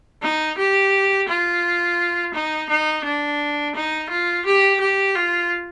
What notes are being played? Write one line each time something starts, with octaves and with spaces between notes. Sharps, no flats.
D#4
G4
F4
D#4
D#4
D4
D#4
F4
G4
G4
F4